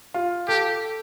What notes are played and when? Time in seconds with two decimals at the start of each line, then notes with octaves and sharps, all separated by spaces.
0.14 F4
0.48 G4 A4